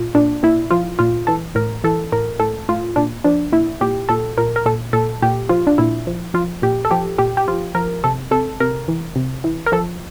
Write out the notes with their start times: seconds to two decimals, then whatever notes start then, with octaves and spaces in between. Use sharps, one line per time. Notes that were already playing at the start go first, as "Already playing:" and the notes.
Already playing: A#2 F4
0.15 A#2 D4
0.43 A#2 E4
0.71 F3 F4
0.99 A#2 F4
1.27 E3 A4
1.55 A2 A#4
1.84 E3 A4
2.12 A2 A#4
2.40 A2 A4
2.69 A2 F4
2.96 A#2 D4
3.24 F3 D4
3.52 A#2 E4
3.81 A#2 G4
4.09 A#2 A4
4.38 A#2 A#4
4.56 A#4
4.66 A#2 A4
4.93 A#2 A4
5.22 A#2 G4
5.49 F3 F4
5.67 D4
5.78 A#2 E4
6.07 F3
6.34 F3 F4
6.62 A#2 G4
6.85 A4
6.91 F3 G4
7.18 A#2 G4
7.37 G4
7.48 F3 F4
7.75 F3 A#4
8.04 C3 A4
8.31 C3 A4
8.60 C3 A#4
8.88 E3
9.16 C3
9.44 E3
9.66 A#4
9.72 F3 A4